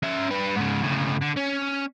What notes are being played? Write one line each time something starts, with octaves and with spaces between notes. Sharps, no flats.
C#4 E5
G3 B4
G#2 C#3
C#2 A2
D3
C#4